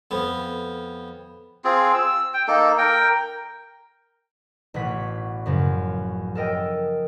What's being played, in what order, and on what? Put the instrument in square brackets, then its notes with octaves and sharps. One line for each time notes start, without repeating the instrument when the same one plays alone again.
[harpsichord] F2 B3
[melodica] C4 F4 G#4
E6
G5
A#3 D#4 A4
A#4 G5
[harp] A1 B2 C#5 F#5 B6
F#2 C#3 F3
A4 A#4 D#5 G5